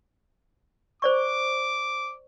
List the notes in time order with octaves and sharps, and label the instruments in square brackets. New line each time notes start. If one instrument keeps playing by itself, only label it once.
[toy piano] C5 D5 C#6 [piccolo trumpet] D6